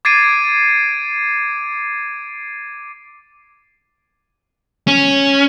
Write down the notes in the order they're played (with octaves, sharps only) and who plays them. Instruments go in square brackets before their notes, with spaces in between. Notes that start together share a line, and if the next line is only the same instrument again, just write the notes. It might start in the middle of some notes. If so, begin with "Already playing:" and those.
[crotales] D6 G#6 A6 C7 D7 D#7
[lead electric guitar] C#4